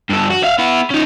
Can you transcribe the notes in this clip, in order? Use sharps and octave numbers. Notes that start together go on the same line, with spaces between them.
G2 A4
F#4
E5 F5
B3 E4
C#4 D#4